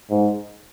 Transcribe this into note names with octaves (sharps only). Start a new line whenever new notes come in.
G#2